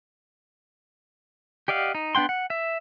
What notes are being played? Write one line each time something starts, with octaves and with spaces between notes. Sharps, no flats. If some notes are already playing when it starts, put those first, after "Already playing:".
G4 D5 D#5 F5 F#5
D#4
B3 D4 F#5 G5 C6
F#5
E5